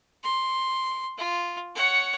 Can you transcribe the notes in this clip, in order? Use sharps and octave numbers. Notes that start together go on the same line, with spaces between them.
C6
F4
C#5 F#5